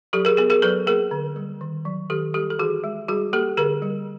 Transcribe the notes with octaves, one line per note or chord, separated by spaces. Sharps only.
F#3 G4 A4
G#4 A#4
B3 G#4 A#4
G#4 A#4
F#3 A4 B4
A#3 G#4 A#4
D3
G3
D#3
F#3
D#3 G4 A4
G3 G4 A4
A4
E3 F#4 G#4
G#3
G3 F#4 G#4
A#3 G4 A4
D3 G#4 A#4
G3